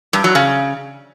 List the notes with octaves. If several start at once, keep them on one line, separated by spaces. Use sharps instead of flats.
G2
F#3
C#3